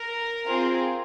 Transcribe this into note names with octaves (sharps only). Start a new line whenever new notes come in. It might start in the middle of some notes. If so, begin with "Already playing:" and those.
Already playing: A#4
C4 F4 G#4